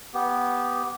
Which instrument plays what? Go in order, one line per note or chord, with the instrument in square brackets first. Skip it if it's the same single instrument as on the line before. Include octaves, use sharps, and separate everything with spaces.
[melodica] B3 G4